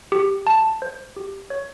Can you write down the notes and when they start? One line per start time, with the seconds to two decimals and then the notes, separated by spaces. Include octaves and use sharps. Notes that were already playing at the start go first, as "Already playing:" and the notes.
0.12 G4
0.47 A5
0.82 C5
1.17 G4
1.50 C#5